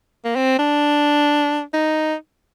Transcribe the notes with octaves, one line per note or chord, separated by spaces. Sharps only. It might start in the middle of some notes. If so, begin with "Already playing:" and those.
A#3
C4
D4
D#4